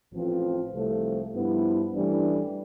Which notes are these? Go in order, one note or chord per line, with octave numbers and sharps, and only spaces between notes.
A1 A2 F3 C4 F4
C2 C3 F3 A3
G2 F3 B3 E4
A1 A2 E3 G3 D4